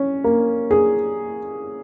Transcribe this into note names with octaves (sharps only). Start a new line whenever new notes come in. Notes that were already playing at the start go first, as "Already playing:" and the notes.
Already playing: C#4
A#3
G#4